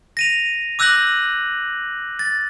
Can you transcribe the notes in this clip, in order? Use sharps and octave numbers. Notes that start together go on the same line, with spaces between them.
A#6 D#7 F7
D6 E6 F#6 G6 A#6 F#7
A6